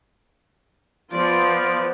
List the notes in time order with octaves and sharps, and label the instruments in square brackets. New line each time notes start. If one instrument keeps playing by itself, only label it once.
[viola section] F3 B3 [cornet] F4 [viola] D5